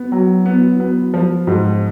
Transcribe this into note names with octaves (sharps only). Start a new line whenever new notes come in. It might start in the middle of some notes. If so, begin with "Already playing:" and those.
Already playing: B3
F#3
B3
B3
F3
G#2